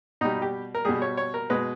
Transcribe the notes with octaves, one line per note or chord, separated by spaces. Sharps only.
B2 G3 D#4
G4
A#4
B2 G3 G#4
C#5
C#5
A#4
B2 G#3 B4